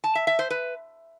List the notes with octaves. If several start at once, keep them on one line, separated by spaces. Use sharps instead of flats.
A5
E5
E5
C5
B4